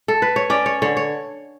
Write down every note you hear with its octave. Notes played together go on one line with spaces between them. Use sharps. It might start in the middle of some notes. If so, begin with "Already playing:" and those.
A4
B4
C#5
C#4 D5
C#5
D3 C#5
C#5